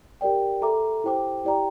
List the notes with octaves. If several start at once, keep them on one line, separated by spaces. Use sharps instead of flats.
G4 A#4 D5 G5
A4 E5 A#5 D6
E4 G4 C5 G5 D6
E4 G4 D5 G5 A#5